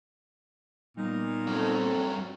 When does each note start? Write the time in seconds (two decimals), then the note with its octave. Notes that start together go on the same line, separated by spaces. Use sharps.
0.97 A#2 G3 B3 D#4 D#5
1.47 G2 F#3 C4 A4